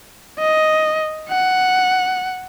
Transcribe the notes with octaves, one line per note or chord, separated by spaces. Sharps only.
D#5
F#5